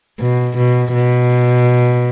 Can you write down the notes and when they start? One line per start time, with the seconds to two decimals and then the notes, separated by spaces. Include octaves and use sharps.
0.20 B2
0.58 B2
0.94 B2